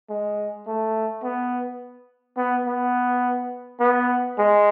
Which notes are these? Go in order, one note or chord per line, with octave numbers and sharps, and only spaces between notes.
G#3
A3
B3
B3
B3
B3
G#3